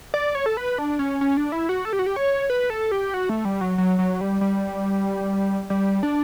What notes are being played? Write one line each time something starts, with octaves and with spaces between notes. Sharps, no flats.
D5
C#5
A4
B4
D4
C#4
C#4
D4
E4
F#4
A4
G4
F#4
G4
C#5
B4
A4
G4
F#4
A3
G3
F#3
F#3
F#3
G3
G3
G3
D4